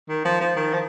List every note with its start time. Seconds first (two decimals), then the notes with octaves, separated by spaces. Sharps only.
0.09 D#3
0.25 F3
0.41 F3
0.56 D#3
0.74 F3